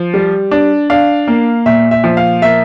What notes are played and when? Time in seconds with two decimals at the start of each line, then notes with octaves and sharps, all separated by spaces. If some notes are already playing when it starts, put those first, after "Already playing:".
Already playing: F3
0.14 G3
0.51 D4
0.90 D4 F5
1.28 A#3
1.66 A#2 E5
1.91 E5
2.04 F3
2.17 F5
2.42 A#3 E5